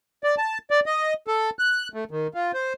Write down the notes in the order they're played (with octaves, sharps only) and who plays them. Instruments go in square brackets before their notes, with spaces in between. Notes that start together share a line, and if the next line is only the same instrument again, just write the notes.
[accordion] D5
A5
D5
D#5
A4
F#6
A3
D#3
F4
C5